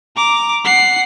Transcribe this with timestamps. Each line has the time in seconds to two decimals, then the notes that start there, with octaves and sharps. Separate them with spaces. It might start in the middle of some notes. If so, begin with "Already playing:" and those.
0.16 A#5 D6
0.64 F#5 C7